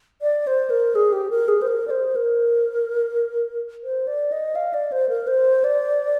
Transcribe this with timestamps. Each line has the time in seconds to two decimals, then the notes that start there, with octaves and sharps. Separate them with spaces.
0.22 D5
0.47 C5
0.70 A#4
0.95 G#4
1.13 G4
1.31 A#4
1.48 G#4
1.62 C5
1.67 A#4
1.87 D5
1.90 C5
2.16 A#4
3.84 C5
4.07 D5
4.32 D#5
4.55 F5
4.74 D5
4.92 C5
5.09 A#4
5.27 C5
5.64 D5